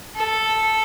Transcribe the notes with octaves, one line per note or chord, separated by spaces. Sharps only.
A4